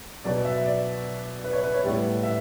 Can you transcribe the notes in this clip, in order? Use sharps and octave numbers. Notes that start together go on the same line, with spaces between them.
B2 F#3 B3 D5
E5
D5
B4
C#5
B4
C#5
A2 G3 B3 D5
E5